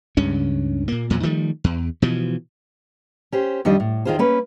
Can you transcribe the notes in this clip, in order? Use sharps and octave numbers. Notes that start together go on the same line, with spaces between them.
C#2 G2 C#3 C#4
A#2 A#3
E2 A#2 F#3
D#3 F3 G3 A3
E2
B2 E3 F3
C#4 G4 C5
F2 D#3 G3 D4 D#5
A2
E2 D#3 E3 F4 G#4 C5
A#3 C#4 B4